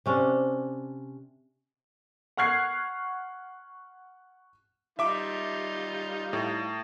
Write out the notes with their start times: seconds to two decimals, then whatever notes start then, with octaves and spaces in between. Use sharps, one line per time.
0.06 C3 C#4 D4
2.37 F#5 C#6 F6 F#6 G#6 C7
4.99 G3 D#4 F4 E5 D6
6.33 A2